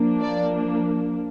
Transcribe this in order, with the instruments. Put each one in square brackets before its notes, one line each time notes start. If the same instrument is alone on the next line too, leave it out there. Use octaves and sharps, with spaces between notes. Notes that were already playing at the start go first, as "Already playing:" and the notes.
Already playing: [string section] F3 A#3 D4
D5